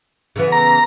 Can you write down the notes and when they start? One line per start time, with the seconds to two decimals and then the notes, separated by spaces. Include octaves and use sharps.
0.36 C#3 E3 B3
0.52 A#5